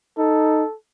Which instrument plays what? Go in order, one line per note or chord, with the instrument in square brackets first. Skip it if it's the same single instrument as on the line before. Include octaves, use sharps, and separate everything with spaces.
[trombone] D#4 [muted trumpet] A4